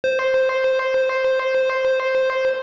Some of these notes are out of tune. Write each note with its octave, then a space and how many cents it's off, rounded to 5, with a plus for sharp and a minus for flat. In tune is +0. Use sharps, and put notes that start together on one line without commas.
C5 +0